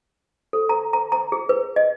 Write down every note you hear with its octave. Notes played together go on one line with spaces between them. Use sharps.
A4
A#5
A#5
A#5
G#4
B4
D#5